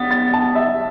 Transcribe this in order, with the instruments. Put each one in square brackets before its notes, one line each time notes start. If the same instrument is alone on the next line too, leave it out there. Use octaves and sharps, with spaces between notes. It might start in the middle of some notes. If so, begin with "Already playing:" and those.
Already playing: [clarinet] B3 [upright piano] A6 B6
[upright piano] A6
A5
E5